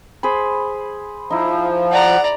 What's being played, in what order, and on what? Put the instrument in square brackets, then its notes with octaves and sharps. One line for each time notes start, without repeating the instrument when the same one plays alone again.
[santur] G#4 C5 B5
[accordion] F3 [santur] D#4 E4 [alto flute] F5
[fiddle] D5 A#5 [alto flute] F#5